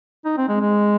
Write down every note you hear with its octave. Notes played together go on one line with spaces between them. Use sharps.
D#4
C4
G#3
G#3